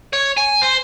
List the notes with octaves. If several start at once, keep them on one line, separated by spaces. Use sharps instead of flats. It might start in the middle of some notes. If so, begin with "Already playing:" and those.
C#5
G#5
C5